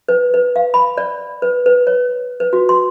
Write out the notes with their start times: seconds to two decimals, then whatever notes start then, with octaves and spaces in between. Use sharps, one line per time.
0.09 B4
0.34 B4
0.56 F5
0.74 B5
0.98 D5
1.42 B4
1.66 B4
1.87 C#5
2.40 B4
2.53 F#4
2.69 C6